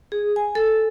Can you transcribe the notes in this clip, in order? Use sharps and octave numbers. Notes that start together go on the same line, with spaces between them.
G#4
G#5
A4